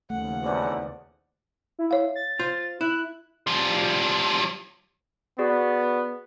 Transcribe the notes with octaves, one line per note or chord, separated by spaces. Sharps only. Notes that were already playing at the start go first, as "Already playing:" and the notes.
D#2 C#3 F3 A3 F#5
B1 E2 C5 D5
E4
C#5 F5
A6
F4 C5
E4 F#6
F3 G3
B3 F#4 G#4 D5